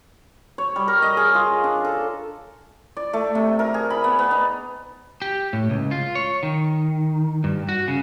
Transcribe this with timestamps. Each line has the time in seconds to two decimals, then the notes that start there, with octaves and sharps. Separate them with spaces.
0.58 C#5
0.76 G3
0.88 A#4
1.02 D#5
1.17 G#4
1.35 F4
1.64 D4
1.85 A4
2.97 D5
3.13 A3
3.35 C3
3.59 A#4
3.74 G#4
3.90 B5
4.04 B3
4.19 B3
4.31 D#4
5.22 G4
5.53 A2
5.70 C#2
5.91 F4
6.15 C#5
6.43 D#3
7.44 G2
7.69 F#4
7.88 C#3